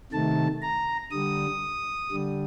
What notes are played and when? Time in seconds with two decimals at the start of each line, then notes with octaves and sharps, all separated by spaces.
0.12 C3 D#3 A3 A5
0.62 A#5
1.11 D3 G3 D#6
2.12 D3 G3